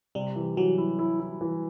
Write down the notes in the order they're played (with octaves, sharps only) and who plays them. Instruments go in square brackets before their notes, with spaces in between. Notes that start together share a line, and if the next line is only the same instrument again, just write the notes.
[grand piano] C3 [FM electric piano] G3
[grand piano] E3
[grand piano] E3 [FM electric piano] F#3
[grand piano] E4
E4
E4
E3